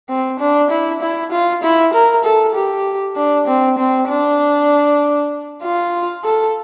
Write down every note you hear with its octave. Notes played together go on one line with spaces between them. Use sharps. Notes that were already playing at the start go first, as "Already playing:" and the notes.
C4
D4
E4
E4
F4
E4
A#4
A4
G4
D4
C4
C4
D4
F4
A4